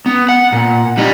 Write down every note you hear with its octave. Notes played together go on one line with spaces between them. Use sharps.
B3
F#5
A#2
G3 D#4